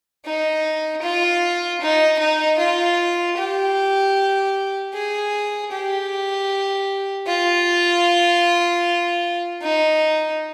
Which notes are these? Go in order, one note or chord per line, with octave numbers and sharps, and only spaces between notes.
D#4
F4
D#4
D#4
F4
G4
G#4
G4
F4
D#4